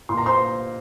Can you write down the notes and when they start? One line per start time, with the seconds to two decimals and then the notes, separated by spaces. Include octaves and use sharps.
0.09 A#2 C6
0.17 A#5
0.26 C5 C6